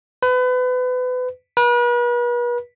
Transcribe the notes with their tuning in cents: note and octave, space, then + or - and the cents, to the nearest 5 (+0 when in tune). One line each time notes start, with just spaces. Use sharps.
B4 +30
B4 -40